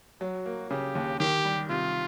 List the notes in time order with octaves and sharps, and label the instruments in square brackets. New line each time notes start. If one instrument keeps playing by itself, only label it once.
[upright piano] F#3 [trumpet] F#4
[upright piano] A#3
[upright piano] C#3 [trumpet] G4
[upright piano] D#2
[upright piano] D#3 [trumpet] G4
[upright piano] G3
[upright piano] C3 [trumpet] F4